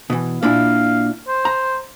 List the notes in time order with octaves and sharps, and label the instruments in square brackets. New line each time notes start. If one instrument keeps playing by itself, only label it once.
[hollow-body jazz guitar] B2 E3
[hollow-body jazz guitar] A#2 D4 E4 [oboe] F5
[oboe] C5
[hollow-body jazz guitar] A#5